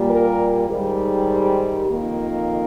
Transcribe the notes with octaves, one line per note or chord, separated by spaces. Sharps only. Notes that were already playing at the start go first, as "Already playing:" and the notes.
Already playing: A#2 G3 A#3
A#4
G#2 D#3 G3
C5
F2 D#3 A#3